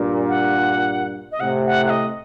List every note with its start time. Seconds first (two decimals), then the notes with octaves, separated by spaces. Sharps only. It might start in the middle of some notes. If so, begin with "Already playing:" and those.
Already playing: G2 A#2
0.29 F#5
1.32 D#5
1.40 A2 C3 F#5
1.66 F#5
1.86 F#5
1.90 D#5